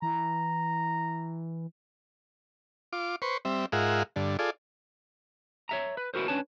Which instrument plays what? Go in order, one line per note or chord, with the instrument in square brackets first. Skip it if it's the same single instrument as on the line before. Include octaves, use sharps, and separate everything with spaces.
[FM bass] E3 [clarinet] A#5
[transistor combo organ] F4 D6
B4 C5 C#6
G3 C4 E5
G#2 F4 G#4 A#4 E5 F#5
G2 D3
F4 G#4 A4 D5
[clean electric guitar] C#5 E5 A#5
B4
B3 E4 F#4 A#4 C5
C#4 D4 B4 C#5 A5